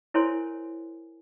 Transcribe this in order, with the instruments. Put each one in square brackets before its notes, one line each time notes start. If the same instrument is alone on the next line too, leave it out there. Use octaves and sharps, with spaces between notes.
[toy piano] E4 A#4 C5 C#5 G#5 C6